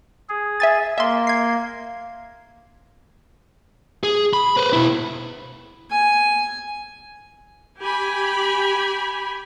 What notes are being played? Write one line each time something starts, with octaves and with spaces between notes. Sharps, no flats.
G#4
E5 G#5 A6
A#3 E5 C6
G#6 C7
G#4
B5
B4 C5
B2 E4
G#5
G4 G#5 B5